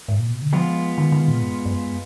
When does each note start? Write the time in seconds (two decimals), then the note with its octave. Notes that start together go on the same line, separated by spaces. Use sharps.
0.08 G#2
0.19 A#2
0.30 B2
0.42 D3
0.53 F3 G#3 B3 F4
0.98 D#3
1.12 D#3
1.28 A#2
1.42 F#2
1.65 F#2